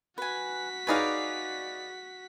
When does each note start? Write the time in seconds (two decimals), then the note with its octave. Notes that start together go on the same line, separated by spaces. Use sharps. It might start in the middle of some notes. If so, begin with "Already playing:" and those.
0.18 F#4 B4 G#5 B6
0.87 D#4 G#4 B4 C#5 D5 F5